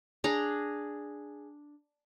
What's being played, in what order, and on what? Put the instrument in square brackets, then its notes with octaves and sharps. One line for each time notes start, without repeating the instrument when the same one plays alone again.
[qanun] D4 G#4 A#5